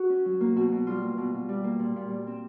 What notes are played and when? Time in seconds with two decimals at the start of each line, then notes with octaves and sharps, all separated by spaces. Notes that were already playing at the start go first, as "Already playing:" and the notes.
Already playing: F#4
0.10 C#4
0.25 F#3
0.41 A#3
0.56 B2 F#4
0.72 B2
0.87 G3 F4
1.02 A#3
1.18 B2
1.34 B2
1.49 G3
1.64 A#3
1.79 A#2
1.96 A#2
2.10 G3
2.27 C4